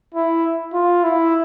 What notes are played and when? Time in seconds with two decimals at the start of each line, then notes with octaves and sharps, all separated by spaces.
0.14 E4
0.73 F4
1.03 E4